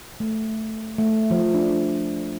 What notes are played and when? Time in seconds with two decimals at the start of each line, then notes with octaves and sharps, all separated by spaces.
0.20 A3
0.98 A3
1.31 F3
1.54 D4